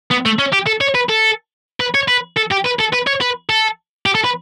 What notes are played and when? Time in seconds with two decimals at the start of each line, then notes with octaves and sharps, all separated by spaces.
0.11 B3
0.25 A3
0.39 C#4
0.53 G4
0.67 A4
0.81 C#5
0.95 B4
1.09 A4
1.80 B4
1.95 C#5
2.08 B4
2.37 A4
2.51 G4
2.65 B4
2.79 A4
2.93 B4
3.07 C#5
3.21 B4
3.50 A4
4.06 G4
4.15 A4
4.25 B4